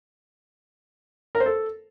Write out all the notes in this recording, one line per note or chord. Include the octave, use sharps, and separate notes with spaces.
A#4
C5
A4